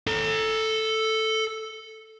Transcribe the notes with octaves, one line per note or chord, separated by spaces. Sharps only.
A4 A#5